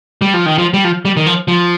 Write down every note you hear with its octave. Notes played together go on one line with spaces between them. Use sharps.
G3
F3
D#3
F3
G3
F3
G3
D#3
F3
F3